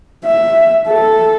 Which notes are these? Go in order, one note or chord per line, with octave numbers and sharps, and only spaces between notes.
E5
A4